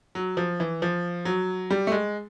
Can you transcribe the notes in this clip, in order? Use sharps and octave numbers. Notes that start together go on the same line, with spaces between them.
F#3
F3
E3
F3
F#3
G3
A3
G#3